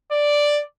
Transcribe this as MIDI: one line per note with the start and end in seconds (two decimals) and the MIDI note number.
0.11 0.62 74